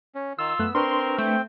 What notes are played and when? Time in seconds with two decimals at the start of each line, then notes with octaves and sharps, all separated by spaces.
0.15 C#4
0.39 D#3 F4 E6
0.59 F#2 A3 B3 F#6
0.75 C4 D4 A#4 B4 C6 C#6
1.18 A3 G5